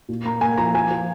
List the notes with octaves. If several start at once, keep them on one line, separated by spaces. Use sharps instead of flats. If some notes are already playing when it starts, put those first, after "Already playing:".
A#2
A#3 A#5
A#3 G#5
F3 A#5
F3 G#5
F3